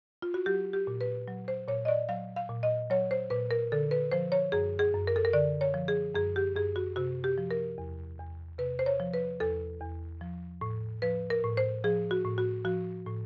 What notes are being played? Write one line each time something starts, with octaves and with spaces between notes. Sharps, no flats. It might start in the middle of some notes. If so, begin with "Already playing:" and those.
F4
F#4
F#3 G4
G4
A#2
B4
F#3
C5
A#2 C#5
D#5
D5
F#3 F5
F5
A#2
D#5
F#3 C#5
C5
A#2 B4
A#4
D3 A4
B4
F3 C5
C#5
F#2 G#4
G#4
F#2
A#4
A4
A#4
D3 D5
C#5
F3
G#4
F#2 G#4
G4
F#2 G#4
F#4
C3 F#4
G4
F3
A#4
E2
E2
C3 B4
C5
C#5
F3
B4
E2 A4
E2
F3
A2
F3 B4
A#4
A2
C5
F3 G#4
F#4
A2
F#4
F3 F#4
A2